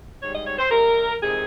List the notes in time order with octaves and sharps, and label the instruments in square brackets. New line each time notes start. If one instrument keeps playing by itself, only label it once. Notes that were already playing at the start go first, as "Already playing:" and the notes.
[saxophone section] G#2 G3 C#5
D#5
C#5
C5
C3 G3 A#4
F2 C3 D#3 G#3 G#4